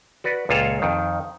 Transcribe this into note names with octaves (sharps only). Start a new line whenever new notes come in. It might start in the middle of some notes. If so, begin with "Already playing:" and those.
F#4 B4 D5
C#2 A#2 F4 A4 C#5
F2 D#3